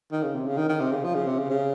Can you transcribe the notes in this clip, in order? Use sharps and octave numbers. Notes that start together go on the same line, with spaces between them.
D#3
C#3
C3
C#3
D#3
D#3
C3
C#3
F3
C#3
C3
C#3
C#3